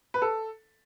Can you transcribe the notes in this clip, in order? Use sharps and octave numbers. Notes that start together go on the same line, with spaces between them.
B4
A4